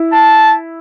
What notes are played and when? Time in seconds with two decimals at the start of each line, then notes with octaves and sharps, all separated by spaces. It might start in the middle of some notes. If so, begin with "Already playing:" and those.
Already playing: E4
0.13 A5